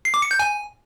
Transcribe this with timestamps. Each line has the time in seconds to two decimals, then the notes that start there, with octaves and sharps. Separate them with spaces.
0.05 C7
0.14 D6
0.22 C#7
0.31 G6
0.39 G#5